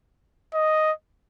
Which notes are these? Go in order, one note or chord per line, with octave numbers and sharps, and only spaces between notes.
D#5